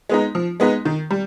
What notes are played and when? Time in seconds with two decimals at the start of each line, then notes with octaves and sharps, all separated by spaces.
0.09 G#3 B3 D#4
0.35 F3
0.60 G#3 B3 D#4
0.85 D#3
1.10 G3